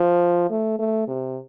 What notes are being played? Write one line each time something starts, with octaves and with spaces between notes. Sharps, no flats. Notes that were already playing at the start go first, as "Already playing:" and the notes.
Already playing: F3
A3
A3
C3